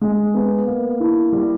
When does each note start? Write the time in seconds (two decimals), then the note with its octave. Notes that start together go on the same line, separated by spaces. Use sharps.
0.01 G#3
0.34 B3
0.67 A#3
1.00 E4
1.32 G3